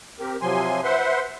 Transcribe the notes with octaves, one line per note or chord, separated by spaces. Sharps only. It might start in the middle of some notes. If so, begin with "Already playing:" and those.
C4 G4 A#4
C3 F3 F#3 G#5 C6
B4 C5 E5 F#5 C6